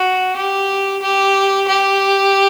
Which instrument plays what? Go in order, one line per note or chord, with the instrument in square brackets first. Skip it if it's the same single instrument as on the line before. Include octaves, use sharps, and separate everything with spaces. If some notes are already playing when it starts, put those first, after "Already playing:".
Already playing: [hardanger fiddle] F#4
G4
G4
G4